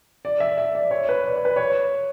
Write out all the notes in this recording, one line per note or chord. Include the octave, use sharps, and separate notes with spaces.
D5
E5
E5
D5
C#5
B4
D5
C#5
B4
C#5